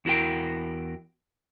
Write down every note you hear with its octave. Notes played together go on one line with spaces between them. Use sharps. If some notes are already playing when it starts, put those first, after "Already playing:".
E2 E4 F#4 A#4 G5